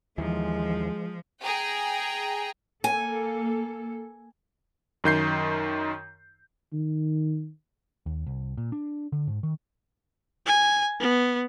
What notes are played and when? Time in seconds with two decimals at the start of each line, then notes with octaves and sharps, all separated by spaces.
0.18 D#2 E3 F3 G#3
1.43 G#4 G5 A#5
2.84 A#3 A4 G#5
5.04 F#2 D#3 G6 C7
6.73 D#3
8.06 D#2
8.27 C2
8.58 A#2
8.72 D4
9.12 D3
9.27 G#2
9.43 D#3
10.47 G#5
11.01 B3